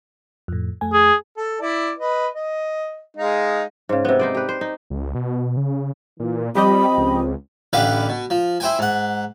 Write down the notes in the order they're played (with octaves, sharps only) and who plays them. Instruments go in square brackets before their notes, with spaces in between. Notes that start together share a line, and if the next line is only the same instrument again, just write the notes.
[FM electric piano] F2 A2
F2 A3 G#5
[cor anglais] G#4
[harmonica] A4
E4 D5
B4 D#5
D#5
G#3 D#4 F5
[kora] G#2 C#3
C3 B3
D#4 C5 D5
G4 B4
C5
D#4
[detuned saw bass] C#2
B2
C#3
[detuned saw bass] A#2 [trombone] E3
[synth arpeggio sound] F3 G4 D#5 [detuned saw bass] G3 [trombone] C4 [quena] B5
[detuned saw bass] C#2
[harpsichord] A1 D3 G4 B4 F5
B2
F3
E4 C5 G5 G#5
G#2 F#5